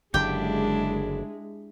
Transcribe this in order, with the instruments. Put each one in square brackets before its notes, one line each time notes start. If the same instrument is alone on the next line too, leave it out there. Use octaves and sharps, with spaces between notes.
[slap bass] F#1 F#2 D3 [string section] G#3 [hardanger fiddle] D4 E4 [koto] G4 G5